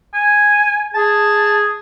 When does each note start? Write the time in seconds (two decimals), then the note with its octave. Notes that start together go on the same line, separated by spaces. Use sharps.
0.14 G#5
0.94 G#4 A5